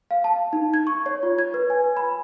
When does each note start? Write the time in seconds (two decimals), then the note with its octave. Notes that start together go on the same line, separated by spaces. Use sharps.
0.11 F5
0.24 A5
0.53 D#4
0.74 G#6
0.87 C#6
1.06 C#5
1.23 F4
1.39 G#6
1.54 B4
1.70 G#5
1.97 B5